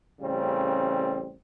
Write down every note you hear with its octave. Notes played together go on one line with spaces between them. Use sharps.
A1 C#3 G3 C4